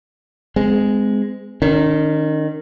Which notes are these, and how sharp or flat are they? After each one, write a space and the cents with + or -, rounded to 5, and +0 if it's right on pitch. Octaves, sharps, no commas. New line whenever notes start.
G#3 +0 C4 -40
D#3 -15 C#4 +30